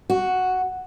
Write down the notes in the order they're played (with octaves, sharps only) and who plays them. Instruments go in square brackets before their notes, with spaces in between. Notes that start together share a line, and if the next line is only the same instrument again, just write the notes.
[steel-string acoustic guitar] F#4